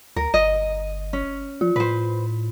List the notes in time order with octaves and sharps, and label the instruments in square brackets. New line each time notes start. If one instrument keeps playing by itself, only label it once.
[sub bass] D2 [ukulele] A#4
[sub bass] G1 [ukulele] D#5
[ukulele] C#4
[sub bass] F3 [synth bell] F4
[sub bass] A2 [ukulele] B4 C5